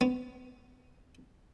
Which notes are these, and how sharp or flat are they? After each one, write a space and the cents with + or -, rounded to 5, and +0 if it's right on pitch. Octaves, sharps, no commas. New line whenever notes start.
B3 +30